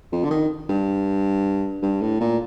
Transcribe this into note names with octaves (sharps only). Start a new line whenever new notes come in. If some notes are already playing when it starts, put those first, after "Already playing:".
F2
D3
D#3
G2
G2
A2
A#2